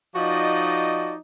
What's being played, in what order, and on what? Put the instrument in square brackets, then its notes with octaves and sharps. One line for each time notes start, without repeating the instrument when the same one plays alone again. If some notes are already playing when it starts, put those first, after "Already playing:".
[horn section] F3 D#4 F#4 D5 D#5